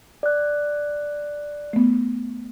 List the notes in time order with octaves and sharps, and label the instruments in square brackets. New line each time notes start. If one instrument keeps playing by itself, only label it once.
[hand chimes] D5 F#6
[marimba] A3 B3